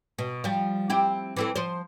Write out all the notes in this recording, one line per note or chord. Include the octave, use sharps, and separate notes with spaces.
B2
F3 G3
C4 E4 G4
E3 C4 A4
F3 C5